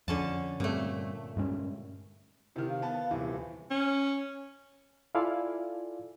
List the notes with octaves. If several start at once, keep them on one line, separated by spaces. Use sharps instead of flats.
F2 D3 C#4 A5
G2 A#2 G3 A3 C4
G2 G#3 C#4
C3 D#3 E4
F5
B3 A5
D#1 C3 E3
C#4
E4 F4 A4 D5 F5 G#5